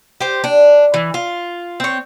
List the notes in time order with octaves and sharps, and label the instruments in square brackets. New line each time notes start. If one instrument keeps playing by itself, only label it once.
[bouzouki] G4 C5
D4
E3
F4
C4 C#5